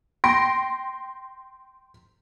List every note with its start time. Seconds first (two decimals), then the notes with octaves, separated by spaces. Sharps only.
0.24 G5 C6 A#6 D7